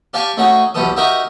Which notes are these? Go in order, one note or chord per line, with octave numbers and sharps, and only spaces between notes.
G4 D5 F5 G#5 A5 C#6
A3 C#4 D#4 F#4 G#4
B1 E2 B2 G4 A4 D#6
D#4 F#4 G4 A#4 D#5 E5